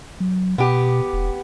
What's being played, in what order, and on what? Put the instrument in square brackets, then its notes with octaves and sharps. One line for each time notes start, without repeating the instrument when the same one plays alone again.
[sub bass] F#3
[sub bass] B2 [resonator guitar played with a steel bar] B3 G4
[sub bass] E1